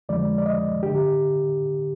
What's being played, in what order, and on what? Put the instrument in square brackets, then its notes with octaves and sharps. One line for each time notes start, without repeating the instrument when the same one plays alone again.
[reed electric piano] F2 D3 F3 G#3 D5
D5
D#5
D3 G4